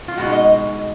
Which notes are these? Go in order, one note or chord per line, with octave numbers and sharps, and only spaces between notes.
F4
B2 G#3 D#4 F#4
D#5